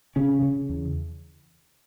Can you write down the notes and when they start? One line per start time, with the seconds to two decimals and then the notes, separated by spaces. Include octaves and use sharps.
0.16 C#3 C#4
0.42 C#3
0.69 E2